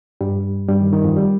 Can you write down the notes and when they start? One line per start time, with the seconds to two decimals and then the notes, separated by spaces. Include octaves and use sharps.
0.21 G2 G3
0.69 G2 G3
0.80 D#3
0.92 D#3
1.04 F2 F3
1.16 G3